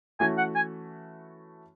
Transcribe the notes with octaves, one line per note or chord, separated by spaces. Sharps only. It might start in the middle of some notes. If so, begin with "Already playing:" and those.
E3 A3 C#4 F#4 G#5
F#5
G#5